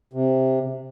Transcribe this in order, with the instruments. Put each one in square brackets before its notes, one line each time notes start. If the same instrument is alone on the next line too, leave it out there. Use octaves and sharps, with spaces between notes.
[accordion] C3